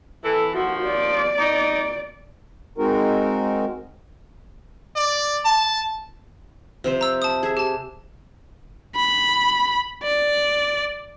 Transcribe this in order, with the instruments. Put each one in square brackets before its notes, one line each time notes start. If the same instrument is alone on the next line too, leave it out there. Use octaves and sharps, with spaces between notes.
[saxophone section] E3 [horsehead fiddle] A4
[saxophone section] D#2 F3 [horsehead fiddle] F#4
[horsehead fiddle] D5
[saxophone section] D#4
[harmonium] G#3 C4 D#4 F#4 A#4
[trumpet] D5
A5
[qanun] C3 F3 C5
[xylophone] A#5 E6
A5 D#6
[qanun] G#4 E5
[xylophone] G4 A5
[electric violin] B5
D5